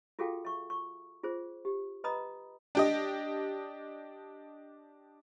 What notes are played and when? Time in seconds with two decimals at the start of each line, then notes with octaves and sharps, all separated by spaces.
0.19 F4 F#4 G#4 A4 F5 G5
0.45 E5 C#6
0.70 C#6
1.23 F4 G#4 C5
1.65 G4
2.04 B4 D#5 A#5 B5 D#6
2.75 D4 G4 D#5